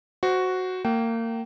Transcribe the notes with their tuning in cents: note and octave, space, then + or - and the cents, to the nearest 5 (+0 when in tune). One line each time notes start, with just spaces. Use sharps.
F#4 +0 C5 -10
A#3 -30 G5 -30